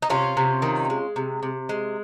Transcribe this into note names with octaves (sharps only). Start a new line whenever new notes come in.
D#4
C3 C#4 F4
C3
D#3
G#3
C3
C3
G#3